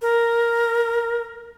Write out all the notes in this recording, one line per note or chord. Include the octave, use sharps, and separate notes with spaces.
A#4